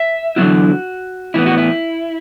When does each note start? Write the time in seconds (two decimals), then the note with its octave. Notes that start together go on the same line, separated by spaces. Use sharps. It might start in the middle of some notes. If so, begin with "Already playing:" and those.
Already playing: E5
0.36 E2 D3 F#3 B3 E4 F#4
1.34 A2 E3 B3 E4
1.46 F#4
1.58 E4